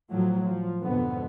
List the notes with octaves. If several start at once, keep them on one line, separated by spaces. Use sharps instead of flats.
A2 F3 F#3
F3
F2 G#2 B2 D3 B3